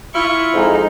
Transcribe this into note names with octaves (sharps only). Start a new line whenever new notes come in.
E4 F4 C#6
F2 G#2 G#3 D#4